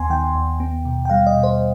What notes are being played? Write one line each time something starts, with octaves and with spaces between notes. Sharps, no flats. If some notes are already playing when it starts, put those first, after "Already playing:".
Already playing: D#2 B3 G#5 C6
D#3 G5
D#2
B3
B2
G5
G3 F5
D#5
B2
C5